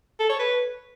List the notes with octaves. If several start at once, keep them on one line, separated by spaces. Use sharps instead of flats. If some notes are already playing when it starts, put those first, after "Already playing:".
A4
C#5
B4